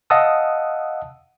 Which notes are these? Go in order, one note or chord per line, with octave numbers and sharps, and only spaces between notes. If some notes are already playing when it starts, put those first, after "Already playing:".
D#5 F5 F#5 A5 D#6 E6